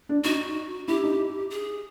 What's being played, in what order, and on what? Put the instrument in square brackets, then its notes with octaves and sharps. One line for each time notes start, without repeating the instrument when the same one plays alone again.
[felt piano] D4
[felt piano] D#4 [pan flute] F#4
[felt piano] E4 [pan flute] G4
[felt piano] D#4
[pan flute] G#4